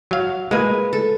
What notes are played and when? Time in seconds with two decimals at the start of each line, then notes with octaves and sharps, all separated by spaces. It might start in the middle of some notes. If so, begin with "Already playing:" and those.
0.11 F#3 F5
0.51 G#3 A#3 B4 G#5
0.93 A4